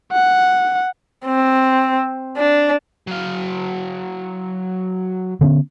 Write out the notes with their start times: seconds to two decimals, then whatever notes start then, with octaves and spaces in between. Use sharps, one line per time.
0.12 F#5
1.26 C4
2.37 D4
3.07 F#3 F5
5.41 D3 B3 C#4